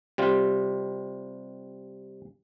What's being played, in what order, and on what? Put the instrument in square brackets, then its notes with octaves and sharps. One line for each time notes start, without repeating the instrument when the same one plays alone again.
[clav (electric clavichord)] C3 G3 F4